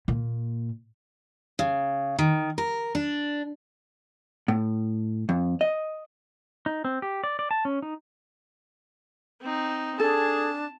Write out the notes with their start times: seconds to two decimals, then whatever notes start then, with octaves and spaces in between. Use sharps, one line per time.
0.08 A#2
1.59 C#3
2.19 D#3
2.58 A#4
2.95 D4
4.48 A2
5.29 F2
5.61 D#5
6.66 D#4
6.85 C4
7.02 G4
7.24 D5
7.39 D5
7.51 A5
7.65 C#4
7.82 D#4
9.40 C4 D#4
10.00 D4 G#4 A4 A5